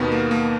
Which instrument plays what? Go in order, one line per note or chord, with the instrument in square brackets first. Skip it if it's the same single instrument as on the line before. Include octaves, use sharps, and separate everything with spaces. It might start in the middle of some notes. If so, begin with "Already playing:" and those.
Already playing: [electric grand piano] D#2 B2 D#3 B3
A#3
A#3